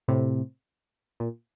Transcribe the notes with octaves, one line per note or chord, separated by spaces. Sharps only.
A2 C3
A#2